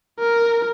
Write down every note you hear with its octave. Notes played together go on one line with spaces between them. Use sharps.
A#4